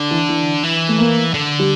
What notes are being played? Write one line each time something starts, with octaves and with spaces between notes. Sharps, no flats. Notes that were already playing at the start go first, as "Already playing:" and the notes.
Already playing: D3
E3
E3
E3
A3
A#3
D3
G3